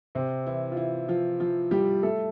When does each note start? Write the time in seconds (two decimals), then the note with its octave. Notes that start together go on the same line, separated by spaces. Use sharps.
0.15 C3 C4
0.46 E3 E4
0.72 F4
0.77 E3 E4
1.08 F3 F4
1.40 F3 F4
1.71 G3 G4
2.03 A3 A4